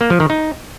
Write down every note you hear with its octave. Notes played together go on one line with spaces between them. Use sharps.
A#3
F3
D#3
D#4